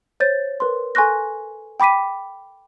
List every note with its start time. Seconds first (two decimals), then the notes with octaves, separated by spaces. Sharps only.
0.20 C5 C#5 G6 A6
0.60 A#4 B4 C6
0.95 A4 G#5 C6 C#6 F#6 A#6
1.80 G5 B5 D6 B6 D#7